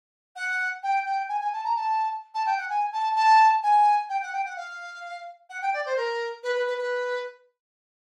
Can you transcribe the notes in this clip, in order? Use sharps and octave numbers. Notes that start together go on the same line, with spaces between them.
F#5
G5
G5
G#5
G#5
A5
A#5
A5
A5
G5
F#5
G#5
A5
A5
G#5
G5
F#5
G5
F#5
F5
F#5
G5
D5
C5
A#4
B4
B4
B4
B4